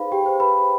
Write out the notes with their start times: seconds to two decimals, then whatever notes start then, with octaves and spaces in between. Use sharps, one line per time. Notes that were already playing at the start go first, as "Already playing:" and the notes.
Already playing: D#4 G#4 B4 C5 F5 B5
0.12 G4 G5
0.26 C5
0.40 B4 B5